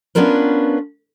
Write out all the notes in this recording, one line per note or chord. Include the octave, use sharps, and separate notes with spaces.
B3 C#4 D4 F4 A#4 B4